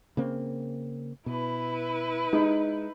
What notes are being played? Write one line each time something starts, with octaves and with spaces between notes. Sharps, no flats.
C#3 A#3 C4
B2 E4 B4
G#3 D#4